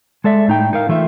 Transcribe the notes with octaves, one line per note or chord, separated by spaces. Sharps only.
G#3 A4 D5 E5
A2 D#4 G5
D#4 A#4 F5
E3 A3 F4 E5